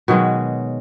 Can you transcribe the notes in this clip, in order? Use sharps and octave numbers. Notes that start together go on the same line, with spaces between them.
B2 D#3 F#3 G#3